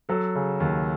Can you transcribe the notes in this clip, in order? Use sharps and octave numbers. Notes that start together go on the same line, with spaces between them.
F#3 A4
C#3
D#2